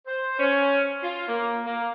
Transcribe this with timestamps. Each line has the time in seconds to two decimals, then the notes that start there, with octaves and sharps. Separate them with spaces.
0.07 C5
0.39 C#4
1.03 F4
1.28 A#3
1.65 A#3